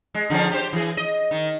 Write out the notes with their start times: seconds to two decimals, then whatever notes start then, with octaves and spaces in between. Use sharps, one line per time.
0.14 G#3
0.30 D3 F3 C#4
0.51 G4 C5
0.73 E3 G#4
0.97 D#5
1.31 D#3